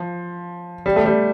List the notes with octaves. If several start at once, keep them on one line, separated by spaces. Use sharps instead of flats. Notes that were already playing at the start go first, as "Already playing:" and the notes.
Already playing: F3
G3
A3
G3